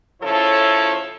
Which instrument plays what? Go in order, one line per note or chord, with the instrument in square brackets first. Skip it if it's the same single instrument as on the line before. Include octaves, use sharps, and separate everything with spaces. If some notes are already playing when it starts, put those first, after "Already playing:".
[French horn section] C#3 F3 E4 A4 C#5